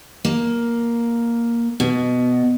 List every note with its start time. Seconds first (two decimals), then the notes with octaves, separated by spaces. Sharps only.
0.25 A#3
1.80 B2